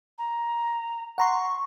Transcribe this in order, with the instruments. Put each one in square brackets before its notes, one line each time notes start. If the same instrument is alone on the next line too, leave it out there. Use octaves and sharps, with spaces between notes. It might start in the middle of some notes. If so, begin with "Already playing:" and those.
[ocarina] A#5
[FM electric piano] F#5 A#5 C6 [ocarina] C#6